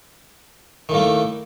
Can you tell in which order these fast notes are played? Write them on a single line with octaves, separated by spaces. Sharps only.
D#3 A2 A#3 A3